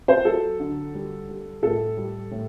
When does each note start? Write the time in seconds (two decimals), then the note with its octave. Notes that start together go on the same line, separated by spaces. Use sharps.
0.08 C5
0.25 F#3 A4
0.60 D3
0.94 G3
1.29 G3
1.62 A2 A4
1.97 G3
2.31 A2